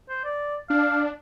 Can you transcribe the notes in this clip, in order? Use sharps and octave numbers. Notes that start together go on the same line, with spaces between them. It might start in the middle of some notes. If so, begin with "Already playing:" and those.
C5
D5
D4 F5